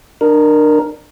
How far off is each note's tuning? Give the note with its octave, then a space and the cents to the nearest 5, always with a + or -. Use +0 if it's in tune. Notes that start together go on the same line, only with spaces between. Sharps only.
D4 +30 A#4 +0